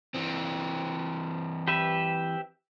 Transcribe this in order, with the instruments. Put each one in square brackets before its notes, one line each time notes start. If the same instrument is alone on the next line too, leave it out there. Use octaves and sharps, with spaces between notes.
[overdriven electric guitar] E3 C4
[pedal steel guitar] G4 B4 E5